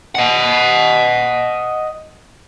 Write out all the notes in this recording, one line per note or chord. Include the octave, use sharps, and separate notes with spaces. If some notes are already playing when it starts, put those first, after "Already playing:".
D#5 F#5